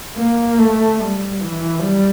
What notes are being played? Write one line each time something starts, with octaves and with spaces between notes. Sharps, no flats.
A#3
A3
G3
E3
G3